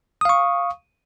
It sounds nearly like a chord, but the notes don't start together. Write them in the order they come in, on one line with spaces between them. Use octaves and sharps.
D#6 F5 C#6